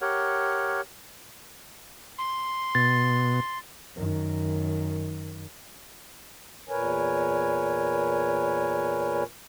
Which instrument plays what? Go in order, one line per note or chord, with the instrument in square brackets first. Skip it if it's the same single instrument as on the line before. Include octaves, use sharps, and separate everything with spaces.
[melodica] G4 A#4 C#5 F#5
[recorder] C6
[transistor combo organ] B2 [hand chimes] A6
[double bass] F#2 D#3
[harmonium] E2 A#2 A#4 B4 C#5 G#5